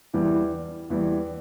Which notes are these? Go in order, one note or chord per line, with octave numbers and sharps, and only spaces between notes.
E2 E3 G3 E4
E2 E3 G3